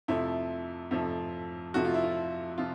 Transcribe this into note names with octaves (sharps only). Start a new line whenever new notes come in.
F2 C3 F3 A3 E4
F2 C3 F3 A3
F2 C3 F3 A3 F#4
F4
E4
F4
C3 F3 F4